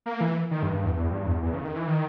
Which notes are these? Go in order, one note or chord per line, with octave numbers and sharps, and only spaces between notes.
A#3
E3
D#3
G2
G2
E2
E2
G2
E2
E2
C#3
D#3
E3
D#3